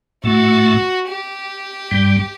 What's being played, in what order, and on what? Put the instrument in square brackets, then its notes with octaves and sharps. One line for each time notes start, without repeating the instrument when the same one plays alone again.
[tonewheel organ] A2 A3 [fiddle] F#4
[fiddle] G4
[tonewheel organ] G2 G3